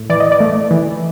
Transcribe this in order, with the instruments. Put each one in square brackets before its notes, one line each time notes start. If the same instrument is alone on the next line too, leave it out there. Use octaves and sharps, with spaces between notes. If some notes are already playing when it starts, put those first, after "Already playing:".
Already playing: [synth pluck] A2
E3 D5
D#5
D5
A3
E3